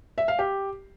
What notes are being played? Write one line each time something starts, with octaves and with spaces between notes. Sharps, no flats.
E5
F5
G4